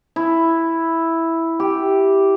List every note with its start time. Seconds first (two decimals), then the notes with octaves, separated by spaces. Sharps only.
0.16 E4
1.60 G4